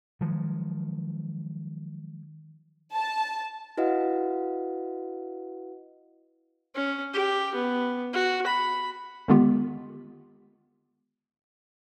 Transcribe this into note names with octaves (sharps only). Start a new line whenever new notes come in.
D#3 F3 F#3 G#3
A5
E4 F#4 B4 D#5 F5 F#5
C#4
G4
B3
F#4
B5
D3 D#3 G#3 B3 F4 G4